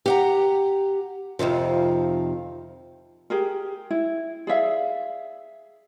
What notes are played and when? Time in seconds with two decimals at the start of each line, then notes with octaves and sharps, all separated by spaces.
0.06 G4 F#5 A#5
1.39 F2 C3 D#3 F3
3.30 G4 G#4 A#4
3.91 E4
4.47 G#4 D5 E5 F5